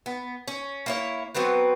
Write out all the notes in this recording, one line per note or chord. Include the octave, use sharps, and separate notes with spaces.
B3
C#4
A#3 E4 C#5
F#3 B3 C4 B4